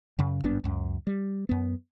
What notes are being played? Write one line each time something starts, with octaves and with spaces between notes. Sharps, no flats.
F#2 C#3
G#1 G2 B3 D4
C#2 F#2
G3
F#2 B3